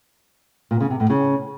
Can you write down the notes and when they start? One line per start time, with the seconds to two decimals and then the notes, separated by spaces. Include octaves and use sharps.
0.71 A#2
0.80 C#3
0.90 C3
1.00 A2
1.10 C#3